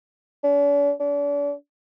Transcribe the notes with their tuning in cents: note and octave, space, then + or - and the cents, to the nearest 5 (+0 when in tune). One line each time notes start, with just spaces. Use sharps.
D4 -45
D4 -40